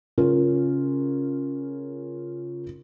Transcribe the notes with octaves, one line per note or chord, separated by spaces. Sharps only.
C#3 C#4 F4 A#4